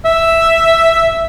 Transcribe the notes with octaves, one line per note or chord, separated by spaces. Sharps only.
E5